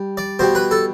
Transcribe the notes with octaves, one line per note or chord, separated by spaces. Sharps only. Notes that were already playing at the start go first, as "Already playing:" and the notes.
Already playing: G3
D5
B2 G3 C5
B4
A4